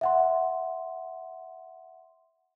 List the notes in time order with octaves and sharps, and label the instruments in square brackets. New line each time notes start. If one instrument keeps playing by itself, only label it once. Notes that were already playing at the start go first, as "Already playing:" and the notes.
[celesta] E5 F#5 C6